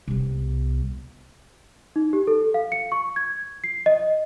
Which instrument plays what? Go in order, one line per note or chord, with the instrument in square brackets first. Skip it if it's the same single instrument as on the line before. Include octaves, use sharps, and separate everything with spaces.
[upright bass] C2 B3
[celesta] D#4
G4
A4
F5
C#7
C#6
G#6
C7
D#5